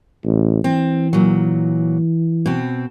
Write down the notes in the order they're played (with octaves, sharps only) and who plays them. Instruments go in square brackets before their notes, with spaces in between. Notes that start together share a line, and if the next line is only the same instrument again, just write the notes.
[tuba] A1
[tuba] E3 [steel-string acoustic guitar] C4
[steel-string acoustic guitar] A#2 F#3
B2 C4